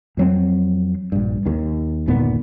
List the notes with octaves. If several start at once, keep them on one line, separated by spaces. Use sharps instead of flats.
F2 F#3 C4
A#1 G2
D#2 D#3
G1 D#2 A#2 B3